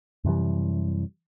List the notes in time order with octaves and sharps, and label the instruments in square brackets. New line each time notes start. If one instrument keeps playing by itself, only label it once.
[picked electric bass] F#2 C3 E3 G3